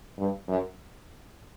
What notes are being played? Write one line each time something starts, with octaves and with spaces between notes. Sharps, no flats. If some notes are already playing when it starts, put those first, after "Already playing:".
G2
F#2